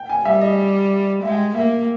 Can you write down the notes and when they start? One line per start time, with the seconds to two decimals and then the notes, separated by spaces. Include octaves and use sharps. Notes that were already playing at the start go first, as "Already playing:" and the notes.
Already playing: G5
0.09 G#5
0.25 G3 E5
0.41 D#5
1.23 G#3 E5
1.30 G5
1.55 A#3 E5